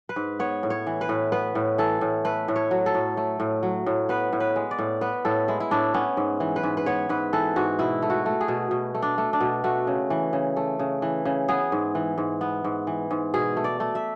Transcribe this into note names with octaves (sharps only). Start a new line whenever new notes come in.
B4
G#2
B3 C#5
A2
C#5
E3
B4
A2
B3 B4
A2
E3 A4
A2
A3 B4
A2
C#5
F#3
A4
A2
A3
A2
F#3
A2
B3 B4
A2
B4
G#3
D5
A2
B3 B4
A2 A4
G#3 E4
E4
A2 D4
B3 C#4
G#2
E3
B4
G#2
B4
B3 C#5
G#2 B4
E3 A4
G#2 F#4
B2 E4
A3
F#4
A3
G#4
B2
B2
A3
D4
A3
D4
B2
A3 F#4
C#3
E3
C#3
A3
C#3
E3
C#3
B3 G#4
G#2
E3
G#2
B3
G#2
E3
G#2
B2 G#4
A3
D5
A3
E5